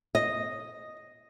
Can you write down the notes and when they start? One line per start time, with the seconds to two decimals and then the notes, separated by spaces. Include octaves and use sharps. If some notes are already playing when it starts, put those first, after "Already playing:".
0.15 D#5